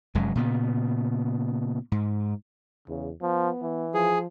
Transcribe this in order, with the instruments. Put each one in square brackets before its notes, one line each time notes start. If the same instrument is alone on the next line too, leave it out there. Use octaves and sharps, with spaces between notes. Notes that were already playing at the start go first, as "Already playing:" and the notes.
[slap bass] F1 F#2 G#3
A#2 C#3 B3
G#2
[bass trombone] E2 [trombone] C#3
[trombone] F3 [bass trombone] B3
[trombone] E3
[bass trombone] F3 [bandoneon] G#4